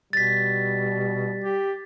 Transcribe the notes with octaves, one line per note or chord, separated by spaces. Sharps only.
B2 G3 A6 B6
G4